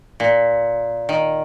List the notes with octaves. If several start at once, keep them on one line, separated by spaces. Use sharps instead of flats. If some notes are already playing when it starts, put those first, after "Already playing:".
A#2
D#3